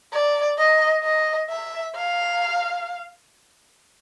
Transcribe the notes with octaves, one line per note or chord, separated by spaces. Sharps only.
D5
D#5
D#5
E5
F5